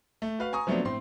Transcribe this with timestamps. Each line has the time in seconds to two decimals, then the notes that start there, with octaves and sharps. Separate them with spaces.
0.22 A3
0.39 F#4 B4 F5
0.53 G#5 A#5 C#6 D#6
0.67 F3 F#3 A3 B3 C4 D4
0.85 A2 C4 C6